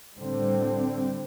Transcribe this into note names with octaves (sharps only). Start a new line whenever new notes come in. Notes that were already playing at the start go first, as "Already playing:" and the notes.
A2 D3 G3 C4